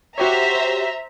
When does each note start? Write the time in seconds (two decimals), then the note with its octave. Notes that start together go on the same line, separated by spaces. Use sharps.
0.18 F#4 G4 C5 C#5 E5 A#5